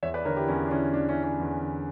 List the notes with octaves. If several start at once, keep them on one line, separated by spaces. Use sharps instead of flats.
E2 C#5 E5
B4 D5
D3 A#4 C#5
E4 G4
E2 C#4 E4
D4
D3 C#4 E4
E2 D4
C#4 E4
D3
C#4
E2
D3